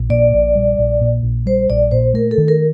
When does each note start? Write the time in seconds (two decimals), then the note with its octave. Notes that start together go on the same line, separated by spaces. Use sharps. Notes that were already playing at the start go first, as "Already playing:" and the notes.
Already playing: A#1
0.10 A#2 D5
0.33 A#1
0.55 G3
0.78 A#1
1.01 A#2
1.23 A#1
1.46 G3 C5
1.70 A#1 D5
1.91 A#2 C5
2.14 A3 A#4
2.31 A4
2.38 D#3
2.48 A#4